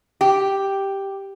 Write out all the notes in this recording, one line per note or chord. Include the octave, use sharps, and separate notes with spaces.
G4